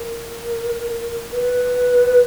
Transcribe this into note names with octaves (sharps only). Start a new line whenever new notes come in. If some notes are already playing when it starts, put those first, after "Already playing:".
Already playing: A#4
B4